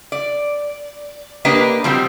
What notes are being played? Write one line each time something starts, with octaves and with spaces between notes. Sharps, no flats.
D5
A#3 D4 G4 B4 D#5
B2 F3 G3 C4